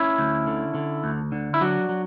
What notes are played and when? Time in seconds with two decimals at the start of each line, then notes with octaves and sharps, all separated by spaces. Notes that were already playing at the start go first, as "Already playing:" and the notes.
Already playing: C#4 E4
0.18 D2
0.47 D3
0.75 D3
1.04 D2
1.32 D3
1.54 E4
1.61 F#3 D4 F#4
1.89 F#3